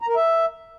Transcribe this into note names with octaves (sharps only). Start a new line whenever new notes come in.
A#5
A#4
E5